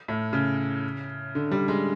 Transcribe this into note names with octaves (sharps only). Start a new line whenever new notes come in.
A2
C#3
D3
G3
G#3